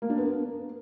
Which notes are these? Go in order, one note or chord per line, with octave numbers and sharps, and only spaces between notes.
A#3
D4
B3
A#4